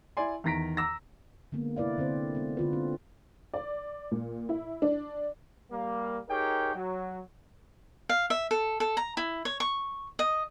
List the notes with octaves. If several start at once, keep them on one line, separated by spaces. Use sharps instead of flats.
E4 D5 G#5 C6
E2 D#3 A#5 A#6 B6 D7
A#5 D6 E6 A#6
D3 G#3 A#3 B3
C3 E4 B4 D5 F5
D3 C4 C5
G#3 B3
D3 F4 B4
C4
D5
A#2
E4
D4
G3 A#3
D#4 G4 G#4 A#4 C#5 G5
F#3
F5
E5
A4
A4
A#5
E4
C#5
C#6
D#5